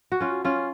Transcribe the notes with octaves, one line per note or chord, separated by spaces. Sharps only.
F#4
C#4 F4
C#4 F4